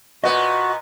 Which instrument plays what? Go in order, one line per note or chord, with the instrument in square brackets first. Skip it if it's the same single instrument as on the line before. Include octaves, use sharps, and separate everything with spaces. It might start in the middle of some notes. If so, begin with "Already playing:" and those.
[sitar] A#2 B3 [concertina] F#4 [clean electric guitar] D#5